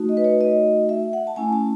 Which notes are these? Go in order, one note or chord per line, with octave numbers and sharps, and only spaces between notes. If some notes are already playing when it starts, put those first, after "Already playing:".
Already playing: A3 D#4 F#4
D#5
B4
C#5
D#5
E5
F#5
A5
A3 C#4 E4 G#5
A5